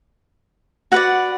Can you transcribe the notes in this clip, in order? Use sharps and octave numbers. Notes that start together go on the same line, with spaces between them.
F#4 B4 D5 F#5